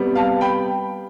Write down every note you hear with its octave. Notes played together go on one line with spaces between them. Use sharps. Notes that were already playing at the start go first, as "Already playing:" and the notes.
Already playing: C3 G3 B3
F5 A5
G5 B5